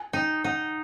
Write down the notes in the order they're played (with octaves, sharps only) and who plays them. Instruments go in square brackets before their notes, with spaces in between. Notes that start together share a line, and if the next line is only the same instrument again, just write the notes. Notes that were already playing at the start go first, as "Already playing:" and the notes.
Already playing: [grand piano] G#5
[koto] D#4 [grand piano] G5
[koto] D#4 [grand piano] F#5